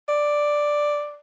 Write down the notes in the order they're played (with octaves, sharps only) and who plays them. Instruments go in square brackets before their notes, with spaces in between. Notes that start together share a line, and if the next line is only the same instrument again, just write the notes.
[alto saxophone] D5